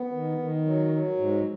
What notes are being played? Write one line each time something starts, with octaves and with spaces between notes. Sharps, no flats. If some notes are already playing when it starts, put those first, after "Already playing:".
Already playing: B3
D#3
D#3
F#3
F#3
G#2